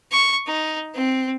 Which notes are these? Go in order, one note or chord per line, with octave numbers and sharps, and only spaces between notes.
C#6
D#4
C4